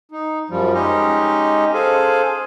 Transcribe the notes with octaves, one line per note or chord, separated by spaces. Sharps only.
D#4
F#2 F3 G3
G#3 C#4 D#4 G4 D#5
G#4 A4 C5 F5 G#5